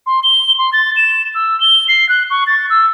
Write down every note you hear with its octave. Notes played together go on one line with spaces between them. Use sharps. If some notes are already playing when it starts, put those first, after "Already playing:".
C6
G7
C6
A6
E7
E6
G7
C7
F#6
C#6
A6
E6